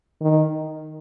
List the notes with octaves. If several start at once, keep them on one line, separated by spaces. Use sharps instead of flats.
D#3